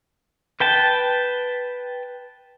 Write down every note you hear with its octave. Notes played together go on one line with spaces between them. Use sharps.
B4 G5 A5